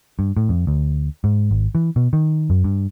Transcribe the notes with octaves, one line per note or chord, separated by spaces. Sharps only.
G2
A2
F2
D2
G#2
G#1
E3
B2
D#3
F#2
G2